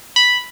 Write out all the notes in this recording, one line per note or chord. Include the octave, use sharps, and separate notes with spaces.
B5